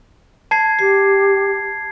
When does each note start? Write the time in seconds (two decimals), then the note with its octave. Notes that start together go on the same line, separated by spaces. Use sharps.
0.51 A5 G#6 C7
0.79 G4 C7